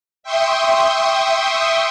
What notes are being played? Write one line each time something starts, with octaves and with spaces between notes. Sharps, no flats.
E5 G5 C6 C#6 D#6